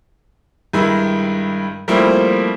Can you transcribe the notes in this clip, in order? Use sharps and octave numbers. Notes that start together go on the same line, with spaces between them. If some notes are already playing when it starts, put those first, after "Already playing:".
G2 D#3 G#3 E4
F3 G3 A3 A#3 C4 E4